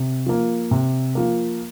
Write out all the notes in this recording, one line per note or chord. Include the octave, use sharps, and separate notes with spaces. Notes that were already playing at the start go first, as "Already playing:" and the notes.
Already playing: C3
F3 A#3
C3
F3 A#3